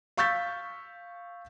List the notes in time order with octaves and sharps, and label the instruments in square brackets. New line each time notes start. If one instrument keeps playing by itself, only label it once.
[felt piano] F5 C#6 E6 G6 A6 B6